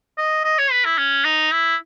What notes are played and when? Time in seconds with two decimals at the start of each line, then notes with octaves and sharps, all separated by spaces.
0.18 D#5
0.44 D#5
0.58 C#5
0.71 B4
0.85 E4
0.98 C#4
1.25 D#4
1.52 E4